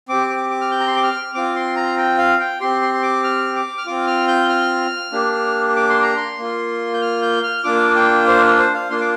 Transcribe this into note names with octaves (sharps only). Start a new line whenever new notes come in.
C4 G4 D6
D6
D6
F6
G6
A#5
C6
D6
F6
C4 F4 D6
C6
A#5
G5
F5
G5
C4 G4 C6
C6
C6
D6
F6
D6
F6
C4 F4 D6
F6
G6
F6
A#3 D4 G4
D6
C6
A#5
C6
A#3 F4
G6
F6
G6
F6
A#3 D4 F4 D6
G5
C5
C5
F5
A#3 D4 F4 C6
D6